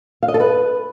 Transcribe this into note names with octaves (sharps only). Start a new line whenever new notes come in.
F5
D#5
A4
B4